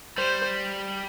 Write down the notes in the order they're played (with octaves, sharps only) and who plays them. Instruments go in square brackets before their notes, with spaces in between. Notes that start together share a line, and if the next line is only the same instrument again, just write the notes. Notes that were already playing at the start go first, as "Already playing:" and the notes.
[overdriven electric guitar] G3 [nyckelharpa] C5